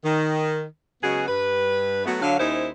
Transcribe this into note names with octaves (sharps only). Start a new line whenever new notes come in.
D#3
C#3 F#3 G#3 B3 F#4 G#4
G2 B4
F#3 A3 B3
D3 F#3 F5
D#2 C#4 D#4 E4 C5